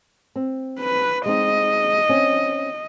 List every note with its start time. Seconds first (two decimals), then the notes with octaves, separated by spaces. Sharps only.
0.36 C4
0.79 B4
1.26 G#3 C4 D#4 D#5
2.09 C4 C#4